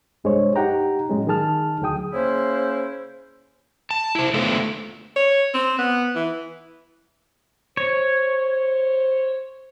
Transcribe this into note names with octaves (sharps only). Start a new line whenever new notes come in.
C2 G2 G#3 D4 C5 C#5
D#4 G4 F#5 G5 A#5
A2 F#3 G#3 C#4
D#3 D#4 G#4 A5 F6
D2 F#3 G#4 G5 D#6
C#3 A#3 C#4 E4 C5
A5
E4 C5
D3 A3 B3 F4 A4 C5
C#5
C4
B3
E3
C5 C#5